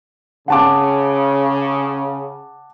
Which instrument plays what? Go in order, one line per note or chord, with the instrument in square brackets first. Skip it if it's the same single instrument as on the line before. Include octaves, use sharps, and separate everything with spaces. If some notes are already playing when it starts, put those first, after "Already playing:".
[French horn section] C#3 [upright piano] F#5 A5 D6